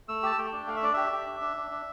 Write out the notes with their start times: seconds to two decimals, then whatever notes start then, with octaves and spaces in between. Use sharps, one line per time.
0.08 A3 E6
0.23 G4 A5
0.38 A3 G5
0.52 D4
0.67 A3 F5
0.76 E5
0.82 D4 D5
0.93 G4 E5
1.12 G4
1.27 D4
1.41 D4
1.57 D4
1.71 D4